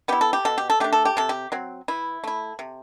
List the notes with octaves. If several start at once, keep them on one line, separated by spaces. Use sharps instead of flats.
B3 E4 G4
A4
G4
B2 A4
G4
A4
A3 D4 G4
A4
G4
C3 A4
G4
F#3 C4
E3 E4
A3 E4
C3